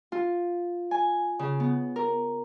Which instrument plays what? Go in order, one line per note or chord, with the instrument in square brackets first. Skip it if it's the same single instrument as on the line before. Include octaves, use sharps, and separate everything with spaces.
[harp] F4
G#5
C#3
B3
A#4